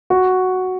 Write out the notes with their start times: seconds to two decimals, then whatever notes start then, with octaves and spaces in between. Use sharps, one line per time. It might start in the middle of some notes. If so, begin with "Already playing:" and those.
0.10 F#4